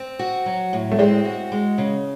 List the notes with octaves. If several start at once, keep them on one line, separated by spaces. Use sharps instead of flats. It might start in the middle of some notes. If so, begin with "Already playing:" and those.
Already playing: C4
F#4
F#3
A2
A3
G#3 C4
F#4
G#3
C#3